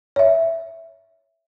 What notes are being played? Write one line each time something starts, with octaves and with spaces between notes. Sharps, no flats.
C#5 E5